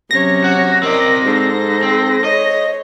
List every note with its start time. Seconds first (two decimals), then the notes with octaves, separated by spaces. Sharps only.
0.11 C3 F#3 C#4 C#5 A#6
0.44 F#4
0.83 C4 A#4 D5 D#5
1.25 G#2 A4 C5
1.83 C4
2.24 C#5 D#5